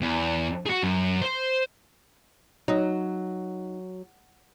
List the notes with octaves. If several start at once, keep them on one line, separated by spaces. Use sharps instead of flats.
E2
F#4 G#4
F#2
C5
F#3 D#4